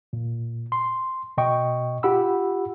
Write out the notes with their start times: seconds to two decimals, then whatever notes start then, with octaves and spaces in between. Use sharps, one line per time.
0.13 A#2
0.72 C6
1.38 B2 D#5 G5 C#6
2.03 F4 G4 F#5 B5 E6